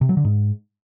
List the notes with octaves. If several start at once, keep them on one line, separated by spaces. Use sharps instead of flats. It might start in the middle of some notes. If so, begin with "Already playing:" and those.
C3
F#3
D3
G#2